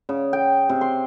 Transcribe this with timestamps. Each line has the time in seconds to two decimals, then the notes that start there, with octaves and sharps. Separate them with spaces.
0.09 C#3
0.33 G5
0.69 C3
0.81 C6